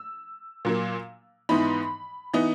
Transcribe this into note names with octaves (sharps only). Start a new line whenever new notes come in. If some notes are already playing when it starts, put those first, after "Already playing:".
Already playing: E6
A#2 F#3 A#3
G#2 E3 B3 D#4 B5
E3 B3 D#4